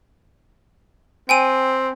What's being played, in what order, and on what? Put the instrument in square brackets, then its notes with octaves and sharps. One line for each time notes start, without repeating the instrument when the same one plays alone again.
[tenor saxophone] C4 [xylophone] G5 G#5 D#7